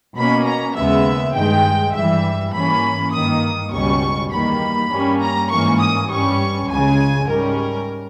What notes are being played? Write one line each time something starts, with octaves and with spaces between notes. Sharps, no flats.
B2 A#3 C#4 B5
A#5
D#2 C#3 G#3 B3 E5
G2 D#3 G#3 G5
G2 E3 G3 E5
G#2 E3 A#3 C#4 B5
G2 D#3 A#3 D#6
C#2 B2 G3 C#4 C#6
E2 D#3 G3 A#3 B5
G2 G3 A#3 C#4
A#5
G#2 E3 A#3 C#4 C#6
D#6
G2 G3 C#4 C#6
C#2 C#3 G#3 G#5
G#2 G3 C#4 A#4